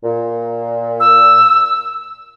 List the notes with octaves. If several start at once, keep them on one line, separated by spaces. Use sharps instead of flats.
A#2
E6